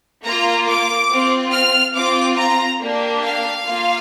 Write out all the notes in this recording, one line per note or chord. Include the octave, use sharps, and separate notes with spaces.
A#3 F4 A#5
D6
C4 F4
F6
C4 F4 D6
A#5
A#3 D4 G4
F5
A#3 F4